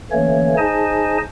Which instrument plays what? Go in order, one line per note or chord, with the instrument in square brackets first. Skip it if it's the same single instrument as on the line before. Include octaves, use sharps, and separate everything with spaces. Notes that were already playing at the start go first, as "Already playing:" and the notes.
[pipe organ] D3 E3 A3 A#3 C#4 C#5
D#4 G#4 C5 D#5 G#5 A5